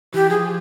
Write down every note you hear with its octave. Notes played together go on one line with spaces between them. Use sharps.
E3 G4
F3 G#4